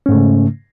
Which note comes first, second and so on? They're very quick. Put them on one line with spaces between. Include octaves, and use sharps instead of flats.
C#4 G#2 A3 C#3